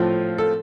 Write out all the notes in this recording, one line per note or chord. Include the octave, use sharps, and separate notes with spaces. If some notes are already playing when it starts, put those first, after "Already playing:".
Already playing: A2 F3 C4 F4
A4